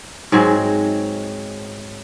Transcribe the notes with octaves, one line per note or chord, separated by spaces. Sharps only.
G#2 F#3 G#3 C4